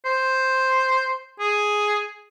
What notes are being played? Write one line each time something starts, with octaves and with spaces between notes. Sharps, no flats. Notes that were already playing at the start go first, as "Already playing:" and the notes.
C5
G#4